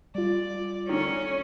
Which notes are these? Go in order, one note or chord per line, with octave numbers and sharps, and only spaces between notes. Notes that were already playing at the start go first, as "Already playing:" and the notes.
G3 F4 D5
D3 D#3 C#4